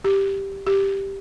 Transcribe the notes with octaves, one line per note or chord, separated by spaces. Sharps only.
G4
G4